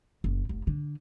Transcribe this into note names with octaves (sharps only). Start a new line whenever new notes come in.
F#1
F1
D3